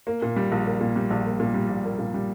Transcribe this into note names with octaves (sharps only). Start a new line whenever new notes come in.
A#3
A#2
G3
A#1
A#3
A#2
G3
A#1
A#3
A#2
G3
A#1
A#3
A#2
G3